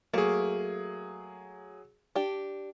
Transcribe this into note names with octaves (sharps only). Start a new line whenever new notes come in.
F#3 A3 A#3 G#4
D4 G4